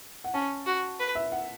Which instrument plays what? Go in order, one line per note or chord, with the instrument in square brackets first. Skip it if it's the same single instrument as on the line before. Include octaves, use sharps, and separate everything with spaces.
[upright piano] F#5
[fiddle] C#4 [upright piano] A5
[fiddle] F#4
B4
[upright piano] E5
F#5